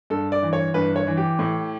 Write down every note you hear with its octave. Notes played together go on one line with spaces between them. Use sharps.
G2 A4
D5
E3
C#5
G2 B4
C#5
E3
G4
A2